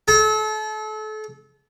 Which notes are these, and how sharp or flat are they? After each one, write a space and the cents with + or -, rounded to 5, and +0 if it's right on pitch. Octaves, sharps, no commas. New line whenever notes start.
A4 -35